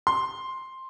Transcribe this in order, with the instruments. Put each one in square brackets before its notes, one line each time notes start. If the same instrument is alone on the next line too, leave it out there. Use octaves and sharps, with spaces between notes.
[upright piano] C6